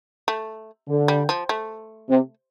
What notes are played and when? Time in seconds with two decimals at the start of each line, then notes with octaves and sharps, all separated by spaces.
0.28 A3
0.88 D3
1.08 G3
1.29 F3
1.49 A3
2.09 C3